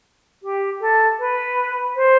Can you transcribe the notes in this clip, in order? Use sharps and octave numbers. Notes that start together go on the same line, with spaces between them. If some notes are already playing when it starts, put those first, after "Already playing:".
G4
A4
B4
C5